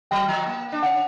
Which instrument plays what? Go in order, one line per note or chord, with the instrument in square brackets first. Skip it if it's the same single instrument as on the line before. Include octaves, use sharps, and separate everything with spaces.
[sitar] F#3 [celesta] G5
[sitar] F3
A#3
D4
[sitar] C#4 [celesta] F#5